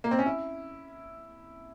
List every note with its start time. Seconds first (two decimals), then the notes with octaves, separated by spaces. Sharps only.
0.04 A#3
0.11 C4
0.19 C#4
0.26 E4